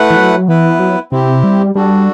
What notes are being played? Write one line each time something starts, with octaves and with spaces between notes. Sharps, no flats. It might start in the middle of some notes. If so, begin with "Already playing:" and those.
Already playing: A3 E4 B4 F#5
E3
F#3
E3 B3 E4 B4
F#3
C3 C4 E4 G4
G3
G3 D4 F#4 A4